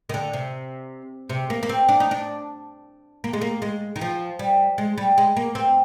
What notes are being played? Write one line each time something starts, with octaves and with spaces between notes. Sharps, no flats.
D#3
D3
C3
C3
A#3
A#3
C4
D4
D#4
D4
A#3
G#3
A#3
G#3
D#3
F3
G3
G#3
G3
G#3
A#3
C4